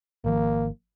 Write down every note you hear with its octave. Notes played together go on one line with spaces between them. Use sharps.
G#1 D#3 F3 A#3